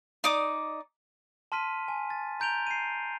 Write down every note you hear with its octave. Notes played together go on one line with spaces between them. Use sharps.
D#4 D5 D6 D#6
A5 C6 F6 B6 D#7
G#5
A6
A#5 G6 D7 F7 G7
C7 D#7